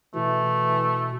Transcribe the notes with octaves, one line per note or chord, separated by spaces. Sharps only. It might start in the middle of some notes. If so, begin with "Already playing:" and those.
B2 E3 A3